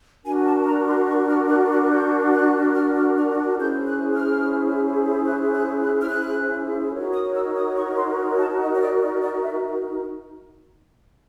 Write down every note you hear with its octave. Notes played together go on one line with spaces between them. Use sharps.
D4 F#4 A#4 G#5
A5
A#5
C6
C#6
F6
F#6
F#6
G6
F#6
F6
F6
F6
F#6
C#4 E4 G#4 C5 G6
F#6
F6
F#6
F#6
F#6
F6
F#6
D#4 F#4 A#4 C#5
D#6
E6
D#6
C#6
C6
A5
D#5
C#5
D5
D5
D5
E5